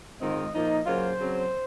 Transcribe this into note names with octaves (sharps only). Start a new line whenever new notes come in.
G#2 D#3 G#3 C4 F4 D#5
A#2 F3 A#3 D#4
C#3 F#3 A#3 F4 C5
C#3 F#3 C4